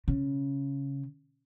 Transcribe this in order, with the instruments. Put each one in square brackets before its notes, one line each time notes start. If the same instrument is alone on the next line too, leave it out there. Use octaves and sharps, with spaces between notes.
[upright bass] C#3